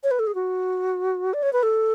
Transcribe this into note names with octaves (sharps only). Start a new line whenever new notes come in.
C#5
B4
A4
G#4
F#4
D5
C#5
B4
A4